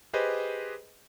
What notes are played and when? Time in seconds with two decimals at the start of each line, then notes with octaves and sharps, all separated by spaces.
0.13 G4 G#4 B4 C5 D#5